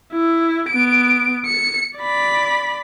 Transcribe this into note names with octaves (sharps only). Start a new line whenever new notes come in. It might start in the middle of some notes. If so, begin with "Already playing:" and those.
E4
B3 D7
C#7
D5 B5